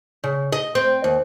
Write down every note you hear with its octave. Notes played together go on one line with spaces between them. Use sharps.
C#3
D#5
C4
D#2